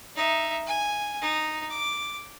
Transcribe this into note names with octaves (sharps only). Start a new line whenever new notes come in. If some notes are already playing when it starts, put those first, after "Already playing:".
D#4 E5
G#5
D#4
D6